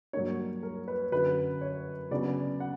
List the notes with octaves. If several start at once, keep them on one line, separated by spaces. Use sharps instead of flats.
G2 F#3 A#3 D4 C#5
A#4
B4
F#2 D3 F#3 B4
C#5
C#3 F#3 B3 D4 D5
F#5